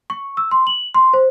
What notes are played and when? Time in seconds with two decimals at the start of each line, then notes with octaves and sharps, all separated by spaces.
0.10 C#6
0.37 E6
0.51 C6
0.67 F#7
0.94 C6
1.13 C5